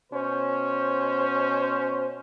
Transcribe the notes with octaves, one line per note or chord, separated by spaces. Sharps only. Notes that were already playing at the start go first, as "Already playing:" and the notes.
B2 C#4 C5